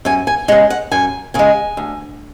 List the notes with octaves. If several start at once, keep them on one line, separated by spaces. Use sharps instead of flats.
F#2 G#5
G#5
C#3 G#3 F#5
F#5
F#2 G#5
C#3 G#3 G#5
D2